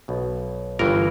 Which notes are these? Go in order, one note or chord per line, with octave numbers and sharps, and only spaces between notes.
B1 B2
G1 G2 E3 A#4